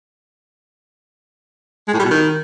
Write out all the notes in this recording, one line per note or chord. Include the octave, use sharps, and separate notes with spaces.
G#3
A2
G3
B2
D#3